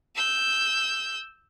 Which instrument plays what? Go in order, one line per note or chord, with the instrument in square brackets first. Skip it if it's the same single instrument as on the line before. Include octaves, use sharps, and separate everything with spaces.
[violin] E6 G6